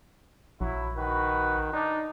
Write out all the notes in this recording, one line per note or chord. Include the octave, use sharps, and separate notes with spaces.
A#1 F#3 E4
D#3 F#4 B4
D4 D#4